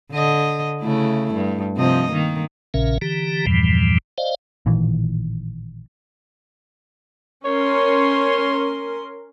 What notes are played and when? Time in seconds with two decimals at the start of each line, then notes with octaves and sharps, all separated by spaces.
0.12 D3 D#5
0.82 C#3 A3 E4
1.34 G2
1.77 C3 F3 D#5
2.12 D#3 A#3
2.74 A#1 A#2 C#3 C#4 A#4 E5
3.02 D3 E3 G4 A#5
3.47 E2 G2 A#2 E3 F3 G3
4.18 C5 D5 D#5 F5
4.66 A1 A#2 D#3 E3
7.45 C#4 A#4 C#5 C6